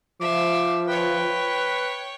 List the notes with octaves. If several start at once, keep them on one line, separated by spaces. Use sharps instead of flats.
F3 E5 F5 D6
B4 C#5 G5